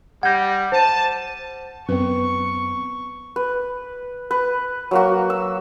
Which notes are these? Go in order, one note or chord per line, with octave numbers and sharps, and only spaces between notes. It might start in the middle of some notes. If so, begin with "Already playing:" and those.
G3 F#5 G6 G#6 A#6
C5 A5 D#7
F#2 B3 C4 B4 C#6
B4
B4
F#3 A#3 F#4
E6